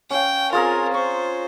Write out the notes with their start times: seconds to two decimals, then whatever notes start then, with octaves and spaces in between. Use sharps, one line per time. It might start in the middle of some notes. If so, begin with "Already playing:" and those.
0.10 C#4 F5 G5
0.53 C4 F4 G#4 A#4 A#5
0.94 C5 C#6